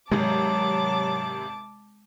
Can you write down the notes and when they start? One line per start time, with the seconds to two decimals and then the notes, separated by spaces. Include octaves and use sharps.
0.11 G#1 C3 F#3 G#3 A5 D6